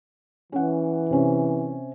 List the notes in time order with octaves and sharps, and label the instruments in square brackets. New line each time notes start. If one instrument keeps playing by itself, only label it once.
[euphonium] E3 [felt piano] C#4 F#5
[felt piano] C3 C#4